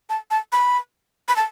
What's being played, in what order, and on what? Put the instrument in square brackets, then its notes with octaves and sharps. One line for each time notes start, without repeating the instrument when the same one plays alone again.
[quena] A5
A5
B5
B5
A5